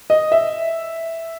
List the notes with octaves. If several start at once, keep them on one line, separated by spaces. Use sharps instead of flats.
D#5
E5